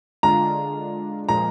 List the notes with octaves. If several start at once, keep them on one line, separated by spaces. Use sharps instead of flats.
D3 G#3 D4 F4 A#5
A#2 F3 G#3 A#5